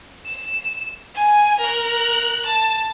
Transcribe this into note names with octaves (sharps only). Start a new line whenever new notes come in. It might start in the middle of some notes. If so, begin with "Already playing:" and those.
E7
G#5
A#4 F#6
A5